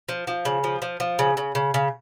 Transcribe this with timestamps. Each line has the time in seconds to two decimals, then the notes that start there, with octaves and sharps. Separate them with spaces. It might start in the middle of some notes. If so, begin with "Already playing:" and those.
0.09 F3
0.27 F3
0.45 C#3
0.64 F3
0.82 F3
1.00 F3
1.19 C#3
1.37 C#3
1.55 C#3
1.74 C#3